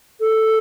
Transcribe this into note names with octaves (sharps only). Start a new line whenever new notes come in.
A4